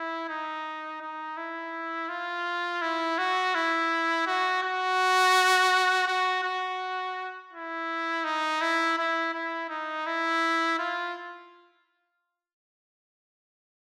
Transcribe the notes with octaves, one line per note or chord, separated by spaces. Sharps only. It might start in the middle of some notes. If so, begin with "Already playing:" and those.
Already playing: E4
D#4
D#4
E4
F4
E4
F#4
E4
F#4
F#4
F#4
F#4
E4
D#4
E4
E4
E4
D#4
E4
F4